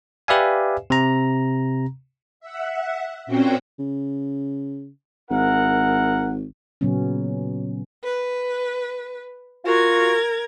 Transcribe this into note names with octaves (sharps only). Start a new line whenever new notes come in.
G4 B4 D5 E5 F5 G#5
C3 A#5
E5 F#5
A#2 C4 C#4 F#4 C5 G5
C#3
G#1 E4 A#4 F#5
A#2 C#3 F#3 B3 C#4
B4
F4 F#4 A#4 G#6